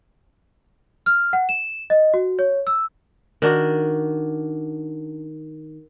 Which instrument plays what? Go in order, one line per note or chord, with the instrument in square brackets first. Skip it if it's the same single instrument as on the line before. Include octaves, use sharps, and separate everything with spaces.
[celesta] F6
F#5
E7
D#5
F#4
C#5
E6
[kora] D#3 D4 F#4